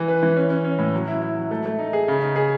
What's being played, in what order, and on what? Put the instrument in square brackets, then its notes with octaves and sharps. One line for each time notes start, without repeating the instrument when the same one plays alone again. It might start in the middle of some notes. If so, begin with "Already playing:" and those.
Already playing: [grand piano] E3
B4
E3
C#4
C#4
C#4
A2
F#3
E4
E4
F#3
A3
A3
D#4
G#4
C#3
D#4
G#4